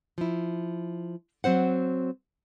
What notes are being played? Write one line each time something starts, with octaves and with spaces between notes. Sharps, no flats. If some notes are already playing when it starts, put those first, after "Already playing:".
F3 E4
F#3 C4 C5 F#5